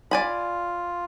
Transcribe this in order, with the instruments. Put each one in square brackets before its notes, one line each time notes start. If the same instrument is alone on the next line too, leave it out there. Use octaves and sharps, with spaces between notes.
[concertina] F4 [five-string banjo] D5 G#5 B5